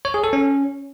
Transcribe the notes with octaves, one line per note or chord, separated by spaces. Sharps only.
C#5
G#4
A4
C#4